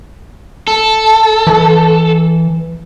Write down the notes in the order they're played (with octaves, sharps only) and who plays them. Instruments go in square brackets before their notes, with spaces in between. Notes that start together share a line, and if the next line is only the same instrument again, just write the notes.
[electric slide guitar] A4
[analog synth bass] E3